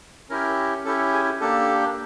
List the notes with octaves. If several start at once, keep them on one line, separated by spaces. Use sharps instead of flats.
C#4 E4 G4 A#4
C#4 E4 G4 A4
G#4
A#3 D4 G4 A4